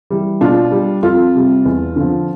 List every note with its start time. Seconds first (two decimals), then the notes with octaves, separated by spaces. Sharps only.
0.10 E3 G3
0.41 B2 D4 F4
0.72 G3
1.03 F2 F4 A4
1.34 C3 G3
1.65 E2
1.96 D3 F3